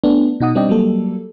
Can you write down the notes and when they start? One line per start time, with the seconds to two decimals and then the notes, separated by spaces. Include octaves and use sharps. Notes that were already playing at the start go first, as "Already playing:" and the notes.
0.04 A3 B3 D4
0.40 B2 D#4 F#5 D#6
0.55 G3 C4 D4 D5 D#5 G5
0.69 F#3 G3 A#3 A4